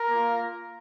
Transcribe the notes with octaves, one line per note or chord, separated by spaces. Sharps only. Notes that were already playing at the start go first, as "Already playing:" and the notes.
Already playing: A#4
A#3
F4